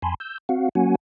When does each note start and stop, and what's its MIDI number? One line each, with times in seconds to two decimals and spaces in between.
0.02 0.14 41
0.02 0.14 80
0.02 0.14 81
0.02 0.14 83
0.02 0.14 84
0.20 0.38 88
0.20 0.38 91
0.49 0.69 60
0.49 0.69 66
0.49 0.69 77
0.49 0.69 78
0.75 0.95 54
0.75 0.95 58
0.75 0.95 61
0.75 0.95 66
0.75 0.95 78
0.75 0.95 80